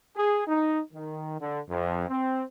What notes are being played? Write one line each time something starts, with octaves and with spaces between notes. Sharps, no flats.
G#4
D#4
D#3
D3
F2
C4